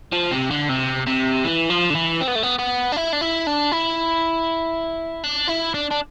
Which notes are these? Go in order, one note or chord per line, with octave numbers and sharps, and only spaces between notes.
F3
C3
D3
C3
C3
E3
F3
D3
E3
C4
B3
A3
B3
B3
D4
E4
D4
E4
D4
E4
D4
E4
D4
D4